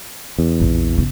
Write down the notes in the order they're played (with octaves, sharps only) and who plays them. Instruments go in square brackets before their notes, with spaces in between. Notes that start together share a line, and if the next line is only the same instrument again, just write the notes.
[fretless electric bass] E2
[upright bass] A#1 F2
G1 C#3